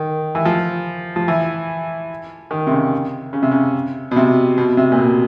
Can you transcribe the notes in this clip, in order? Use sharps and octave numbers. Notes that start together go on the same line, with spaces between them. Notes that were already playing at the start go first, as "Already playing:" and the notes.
Already playing: D#3
E3
F3
F3
E3
D#3
C3
C#3
C#3
C3
C#3
B2
C3
B2
C3
A#2
B2